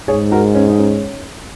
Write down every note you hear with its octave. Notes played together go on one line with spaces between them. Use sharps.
G#2 G#4 C#5
F#4 A#4
C#4
D#4
C#4